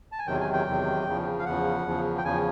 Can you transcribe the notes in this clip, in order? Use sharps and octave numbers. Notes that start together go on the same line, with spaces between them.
A5
G#5
E2 C3 D#3 F#3 G5
G#5
G5
E2 C3 D#3 F#3
E2 C#3 F3
F5
E2 C#3 F3 F#5
E2 C#3 F3
G5
E2 C#3 F3 G#5